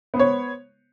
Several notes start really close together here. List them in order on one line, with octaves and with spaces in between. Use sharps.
B3 C5 C#5